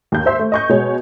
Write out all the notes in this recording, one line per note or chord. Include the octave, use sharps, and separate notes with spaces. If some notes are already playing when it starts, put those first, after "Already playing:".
D#2 G6
C5 E5 C6
A3
D#5 C#6 G6
B2 G#3 C#5